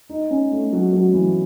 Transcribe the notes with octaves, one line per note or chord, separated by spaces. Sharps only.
D#4
C#4
A3
F#3
F#3
E3